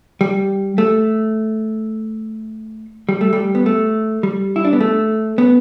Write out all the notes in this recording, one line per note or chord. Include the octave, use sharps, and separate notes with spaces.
G3
A3
G3
A3
G3
B3
A3
G3
E4
D4
B3
A3
B3